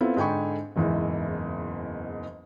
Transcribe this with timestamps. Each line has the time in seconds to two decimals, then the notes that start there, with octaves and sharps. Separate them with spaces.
0.01 B3 C4 E4 F4 A4
0.16 G#2 D3 G5 G#5 B5 C#6
0.76 F#1 E2 G#2 E3